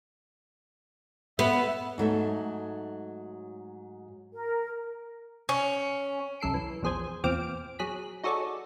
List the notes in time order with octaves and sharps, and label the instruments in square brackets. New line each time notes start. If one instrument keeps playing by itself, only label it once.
[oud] B3 [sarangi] E5
[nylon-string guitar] G#2 F#3 A3 E5
[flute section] A#4
[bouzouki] C#4
[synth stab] C2 F#2 A4 C7 D7
E3
A#1 E2 G#4 C5 G#6
E2 A#2 C4 D6 F6 D7
F#3 G#4 F#6 B6
D#4 F#4 G#4 A4 C#5 D5